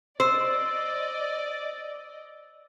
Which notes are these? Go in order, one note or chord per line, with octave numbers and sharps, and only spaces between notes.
C5 D5 D#5 E6